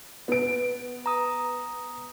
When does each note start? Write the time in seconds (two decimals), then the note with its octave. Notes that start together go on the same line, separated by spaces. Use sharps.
0.28 B3 D7
1.06 A#5 D#6